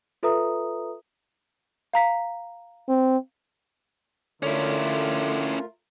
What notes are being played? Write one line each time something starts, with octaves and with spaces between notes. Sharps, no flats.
F4 A4 B4 E5 A#5 D#6
F5 A#5 B6
C4
D3 A3 C#4 E4 F4 A#4 C#5